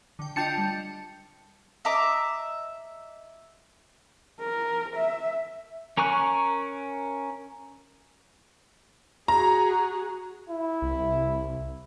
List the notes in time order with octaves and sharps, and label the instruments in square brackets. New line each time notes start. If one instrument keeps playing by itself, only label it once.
[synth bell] D3 G5
[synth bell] D4 F4 D#5 [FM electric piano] G5 A5 C#7
[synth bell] G3
[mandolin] D#5 E5 A#5 D6
[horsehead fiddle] A#4
E5
[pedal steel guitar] C#4 A#4 G#5 C#6 F#6
[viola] F#4 G#4 [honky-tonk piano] A#5
[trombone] E4
[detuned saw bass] C2